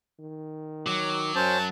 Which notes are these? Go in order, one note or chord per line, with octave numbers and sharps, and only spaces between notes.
D#3
F#3 D6
F#2 C#4 C5 A5